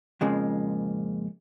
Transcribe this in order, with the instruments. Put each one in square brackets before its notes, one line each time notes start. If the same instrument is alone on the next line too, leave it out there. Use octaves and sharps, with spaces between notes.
[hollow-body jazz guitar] F2 A#2 C#3 F3 G#3 A#3